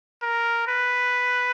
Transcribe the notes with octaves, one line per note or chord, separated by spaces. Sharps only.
A#4
B4